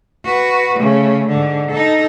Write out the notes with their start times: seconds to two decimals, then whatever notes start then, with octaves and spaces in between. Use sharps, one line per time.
0.25 F#4 B4
0.78 C#3 A3
1.28 G#2 D3
1.71 D#4 A4